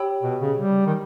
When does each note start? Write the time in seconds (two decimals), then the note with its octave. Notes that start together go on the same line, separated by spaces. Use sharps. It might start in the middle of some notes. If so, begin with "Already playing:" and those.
Already playing: G4 C#5 G5 B5 E6
0.23 B2
0.40 C#3
0.58 G3
0.86 D#3